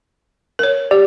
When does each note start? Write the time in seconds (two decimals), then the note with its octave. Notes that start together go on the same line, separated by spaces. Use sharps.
0.59 A#4 C#5
0.91 G4 D5